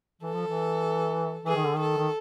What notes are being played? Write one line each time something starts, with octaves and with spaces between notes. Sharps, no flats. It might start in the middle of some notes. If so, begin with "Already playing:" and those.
E3 A4
F3
E3
E3 G#4
D#3
D3
D#3 A4
D#3